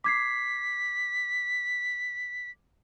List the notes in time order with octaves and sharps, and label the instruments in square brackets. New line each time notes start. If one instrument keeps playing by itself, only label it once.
[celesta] D6 G#6 C7 [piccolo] B6